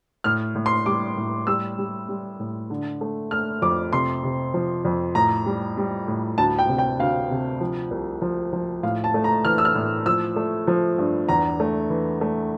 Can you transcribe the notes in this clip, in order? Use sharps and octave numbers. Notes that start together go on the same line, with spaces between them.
A2 F6
A2
C6
G3 D6
A2
G3 E6
G3
G3
A2
D3
A3
A3 F6
F2 D6
C3 C6
C3
F3
F2
A2 A#5
G3
G3
A2
D2 A5
G5
C3
G5
D2 F5
C3
F3
C2
F3
F3
A2 F5
A5
A3
A#5
E3 F6
E6
F6
A2
F3 E6
A3
F3
G2
E2 A#5
A3
E3
A3